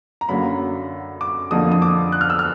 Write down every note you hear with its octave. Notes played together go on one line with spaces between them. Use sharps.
A#5
F#2 D3 F#3 A#3 B5
D6
F2 D3 F3 A#3 D#6
D#6
D6
F#6
F6
E6
F6